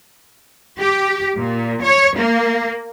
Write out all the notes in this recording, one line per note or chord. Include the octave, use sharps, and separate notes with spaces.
G4
A#2
C#5
A#3